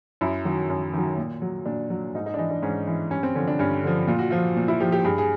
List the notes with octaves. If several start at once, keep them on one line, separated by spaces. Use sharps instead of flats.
F#2 E4
D#3 F#3
F#2
D#3 F#3
A#2
F#3
A#2 D4
F#3
G#2 D#4
D#4
D4
E3 D#4
D4
G#2 C#4
E3
G2 C#4
C4
D3 F3 C#4
D4
G2 C#4
D3 F3
A#2 F4
F#4
F3 F4
A#2
E4
F3 G4
G4
G2 G#4
G#4